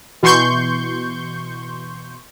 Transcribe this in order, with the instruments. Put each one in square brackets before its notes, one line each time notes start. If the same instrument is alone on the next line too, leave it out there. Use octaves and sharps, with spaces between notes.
[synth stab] B2 E3 C6 C#6 G6